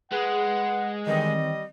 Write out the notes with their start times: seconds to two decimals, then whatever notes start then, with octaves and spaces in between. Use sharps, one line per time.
0.12 G#3 G#4 B4 F#5
1.06 D#3 E3 G3 C4 D#5